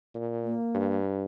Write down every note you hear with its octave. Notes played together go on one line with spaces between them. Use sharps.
A#2
A#3
G2